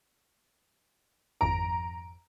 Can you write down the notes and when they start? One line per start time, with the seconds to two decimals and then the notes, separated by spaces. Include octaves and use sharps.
1.41 G#1 F2 A#5 D7